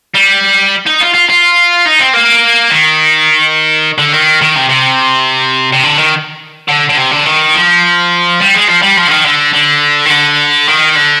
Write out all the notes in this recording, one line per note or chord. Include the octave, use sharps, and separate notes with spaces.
G3
D#4
F4
F4
F4
D#4
C4
A#3
D#3
D3
D#3
D#3
C3
C3
C3
D3
D#3
D3
D3
C3
D3
D#3
F3
G3
G#3
F3
G3
F3
D3
D#3
D3
D3
D#3
D3
D#3
D3